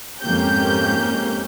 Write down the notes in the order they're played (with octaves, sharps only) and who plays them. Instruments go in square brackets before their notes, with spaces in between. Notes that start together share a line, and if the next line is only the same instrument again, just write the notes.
[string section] F2 G#2 A#3 C#4 G4 G6